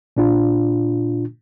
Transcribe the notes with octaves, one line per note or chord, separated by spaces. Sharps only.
A#2 D4 F4